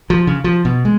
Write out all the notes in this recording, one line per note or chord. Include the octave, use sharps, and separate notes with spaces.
F3
C#3
F3
B2
G#3